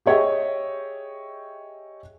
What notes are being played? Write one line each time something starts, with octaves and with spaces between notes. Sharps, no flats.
G4 G#4 C#5 D#5 E5 G5